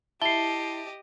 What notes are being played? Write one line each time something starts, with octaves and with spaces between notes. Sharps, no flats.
E4 G4 D#5 A5 C7 G7